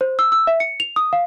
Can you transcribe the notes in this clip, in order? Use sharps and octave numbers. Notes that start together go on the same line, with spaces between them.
C5
E6
E6
E5
C#7
F7
D#6
F5